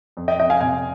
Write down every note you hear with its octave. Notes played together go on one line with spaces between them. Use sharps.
F2
D#5 G5
F2 D#5 G5
F5 G#5
C3 F5 G#5